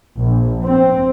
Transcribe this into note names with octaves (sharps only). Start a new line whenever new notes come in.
A#1
C4